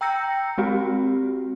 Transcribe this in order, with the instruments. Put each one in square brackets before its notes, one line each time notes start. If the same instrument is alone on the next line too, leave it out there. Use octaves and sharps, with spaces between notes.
[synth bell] G5 A#5 E6 G6 A#6 C#7
G#3 C4 F#4 G4